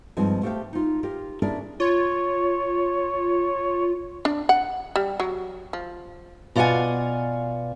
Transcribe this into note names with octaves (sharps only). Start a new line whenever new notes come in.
G2 F3 G#3 C4 D#4 G#5
A3 G4 C5 F5 G5
D#4 F4
F4 G4 A#4
C#4 D4 E4 G#4 A#4 D5
F4 C#5
D4
F#5
G3
F#3
F3
B2 F4 D5 F5 F#5 G#5